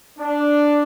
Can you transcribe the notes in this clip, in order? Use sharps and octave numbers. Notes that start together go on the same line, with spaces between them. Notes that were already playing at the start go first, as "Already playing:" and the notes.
D4